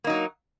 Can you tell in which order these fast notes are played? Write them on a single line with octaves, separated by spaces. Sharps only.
A#3 D#4 F#3